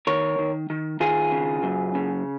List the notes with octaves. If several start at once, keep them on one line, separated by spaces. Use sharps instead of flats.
D#3 A#4 C#5
D#3
D#3
D#3 F4 G#4
C#3
F#2
C#3